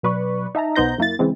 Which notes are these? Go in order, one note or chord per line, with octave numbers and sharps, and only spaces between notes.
B2 F#3 B4 D5 C#6
D#4 E5 A5 A#5
B1 B3 D#4 C5 G6 A#6
F#2 A#3 E4 A6
C#3 E3 G#3 C4